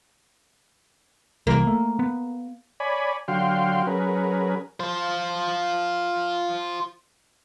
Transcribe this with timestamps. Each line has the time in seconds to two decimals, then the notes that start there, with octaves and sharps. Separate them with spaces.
1.47 C2 E3 G3 A#3
1.67 A3
1.99 B3
2.80 C#5 D5 G#5 B5
3.28 D3 F#3 F#4 F5 G5 C6
3.87 F#3 C#4 G#4 A#4 B4
4.80 F4 C5